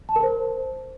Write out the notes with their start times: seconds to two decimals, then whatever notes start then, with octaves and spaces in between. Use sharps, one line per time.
0.09 A5
0.16 A#4
0.23 C5